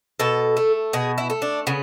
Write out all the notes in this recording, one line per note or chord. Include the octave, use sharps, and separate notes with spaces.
B2 A4
A3
B2 G#4
E4
A3
D4
C#3 B3